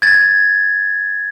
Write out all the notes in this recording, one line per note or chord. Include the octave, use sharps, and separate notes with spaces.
G#6 A6